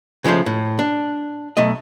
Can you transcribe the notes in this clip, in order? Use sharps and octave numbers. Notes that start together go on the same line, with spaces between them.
C#3 F3 G#3 A3 C5
A2
D4
B1 A3 D#5